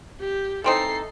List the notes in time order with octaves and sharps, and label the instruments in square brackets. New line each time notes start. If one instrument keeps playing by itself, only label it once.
[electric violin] G4
[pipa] E3 C4 D#4 [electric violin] A4 C7